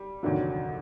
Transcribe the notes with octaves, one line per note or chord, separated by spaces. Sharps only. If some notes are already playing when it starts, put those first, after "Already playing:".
Already playing: G3
F1 D#2 D3 F#3